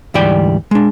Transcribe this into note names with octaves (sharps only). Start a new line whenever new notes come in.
D2 G#2 E3 G3 D5 G5
G#3 D4